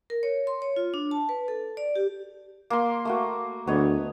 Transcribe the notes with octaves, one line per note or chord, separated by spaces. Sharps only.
A#4
C#5
C6
C#5
F4
D4
A5
B4
A4
D5
G4
A#3 C6
A3 A#3 F#4
D2 B3 C#5 D#5